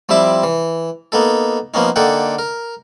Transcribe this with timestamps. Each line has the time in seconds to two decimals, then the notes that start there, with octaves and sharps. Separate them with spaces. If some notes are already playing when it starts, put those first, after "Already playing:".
0.09 F3 G3 C4 E4 E5 D6
0.44 E3
1.12 A#3 B3 D#4 A4
1.74 F3 A#3 B3 C#4 D#4
1.96 D3 A#3 D#4 A4 F#5 G5
2.39 A#4